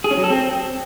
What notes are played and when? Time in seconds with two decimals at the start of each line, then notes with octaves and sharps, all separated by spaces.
0.04 G#4
0.11 C#4
0.17 F#3
0.24 A4
0.30 C4